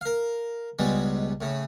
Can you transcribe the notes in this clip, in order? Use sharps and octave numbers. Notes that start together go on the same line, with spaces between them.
A#4 F5
C#2 B2 G3 G#3
A2 C#3